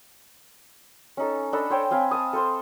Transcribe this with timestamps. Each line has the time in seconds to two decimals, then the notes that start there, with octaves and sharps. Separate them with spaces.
1.17 C#4 D#4 A4
1.53 D4 A4 D#5 B5
1.70 C5 C#5 G5 G#5
1.91 C4 F5 G#5 B5
2.11 G#5 A5 D#6
2.33 A4 C5 C6